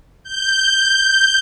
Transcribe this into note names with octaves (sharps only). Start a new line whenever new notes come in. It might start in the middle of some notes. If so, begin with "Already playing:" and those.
G6